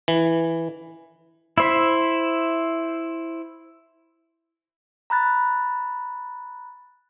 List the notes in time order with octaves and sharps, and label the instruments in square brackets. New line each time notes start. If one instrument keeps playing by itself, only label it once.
[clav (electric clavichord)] E3
[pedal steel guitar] E4 C5 E5
[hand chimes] A#5 B5 F#6 A6